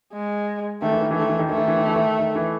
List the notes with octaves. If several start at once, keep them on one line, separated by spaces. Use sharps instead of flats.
G#3
D#3 A3
E3
D#3
E3
D#3 A3
E3
D#3
E3 A3
D#3
E3
D#3
E3
D#3
D#3
E3